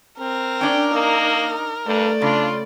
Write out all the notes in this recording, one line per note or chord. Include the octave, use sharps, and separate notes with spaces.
C4 A#4
C#4 D4 D5 G5
A#3 D#4
G2 A3 D5
C#3 D4 F4